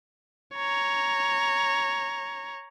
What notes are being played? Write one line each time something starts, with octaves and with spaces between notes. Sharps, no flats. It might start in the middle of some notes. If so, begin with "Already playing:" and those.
C#5 A#5